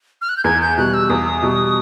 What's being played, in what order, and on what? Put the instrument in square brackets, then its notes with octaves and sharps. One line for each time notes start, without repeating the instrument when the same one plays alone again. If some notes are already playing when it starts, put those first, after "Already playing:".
[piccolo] F6
F#6
G6
[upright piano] E2 [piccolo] G#6
[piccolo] G6
[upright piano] B2 G3 [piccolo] F#6
[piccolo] E6
[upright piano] E2 [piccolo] D#6
[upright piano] B2 G3